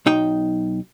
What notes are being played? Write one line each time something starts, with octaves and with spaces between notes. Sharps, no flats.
B1 D#4 G5